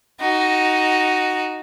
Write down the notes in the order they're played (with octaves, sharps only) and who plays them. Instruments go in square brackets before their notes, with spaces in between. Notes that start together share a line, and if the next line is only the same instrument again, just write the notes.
[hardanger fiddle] D#4 F#4